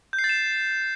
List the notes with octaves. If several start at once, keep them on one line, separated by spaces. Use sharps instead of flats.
G6
C7
A6
E7